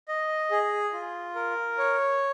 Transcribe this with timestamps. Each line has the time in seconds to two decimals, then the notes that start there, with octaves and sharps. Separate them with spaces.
0.08 D#5
0.51 G#4
0.93 F4
1.35 A#4
1.78 C#5